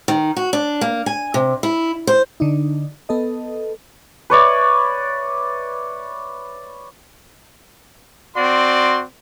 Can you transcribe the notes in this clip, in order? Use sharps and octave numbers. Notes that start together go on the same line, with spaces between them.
D#3
F#4
D4
A#3
G#5
C3
E4
C5
D3 D4 D#4
B3 A4 D#5
B4 C#5 D5 E5
C4 F#4 D5 C6